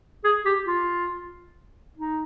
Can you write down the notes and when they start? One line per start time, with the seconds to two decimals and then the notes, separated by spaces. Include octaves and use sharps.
0.24 G#4
0.46 G4
0.67 F4
1.97 D#4